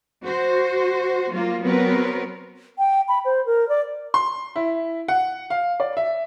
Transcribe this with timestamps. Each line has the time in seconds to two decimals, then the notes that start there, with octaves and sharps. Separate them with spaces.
0.21 F#4 C5
1.31 F#3 A#3 F4
1.63 F#3 B3 C4 A#4 B4 C#5
2.78 G5
3.08 B5
3.25 C5
3.46 A#4
3.69 D5
4.14 C6
4.56 E4
5.08 F#5
5.50 F5
5.80 D5
5.97 E5